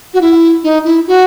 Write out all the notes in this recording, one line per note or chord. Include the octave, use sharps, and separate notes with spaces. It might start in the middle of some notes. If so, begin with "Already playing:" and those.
F#4
E4
D#4
E4
F#4